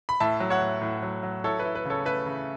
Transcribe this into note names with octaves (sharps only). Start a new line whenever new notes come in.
B5
A2 E5 A5
F#3
C#5 F#5
A2
A2
F#3
F#3
E4 A4 C#5
B4
E4
B4
C#3 A4 C#5
A3 B4 E5
C#3